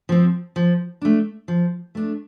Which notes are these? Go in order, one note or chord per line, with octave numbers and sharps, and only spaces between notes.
F3 C4
F3
A3 D4
F3
A3 D4